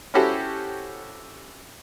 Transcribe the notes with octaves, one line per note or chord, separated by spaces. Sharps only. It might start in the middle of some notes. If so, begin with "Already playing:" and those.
C#4 E4 F#4 G4 A4 C5